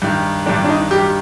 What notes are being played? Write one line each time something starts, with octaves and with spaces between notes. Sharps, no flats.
G2 D#3
G2 D#3 D4
D4
D#4
G2 D#3 G4